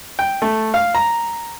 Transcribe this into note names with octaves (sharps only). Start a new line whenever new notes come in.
G5
A3
F5
A#5